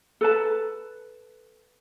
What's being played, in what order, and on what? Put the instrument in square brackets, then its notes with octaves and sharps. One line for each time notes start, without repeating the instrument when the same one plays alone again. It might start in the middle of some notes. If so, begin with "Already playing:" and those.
[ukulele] A4 B4 A5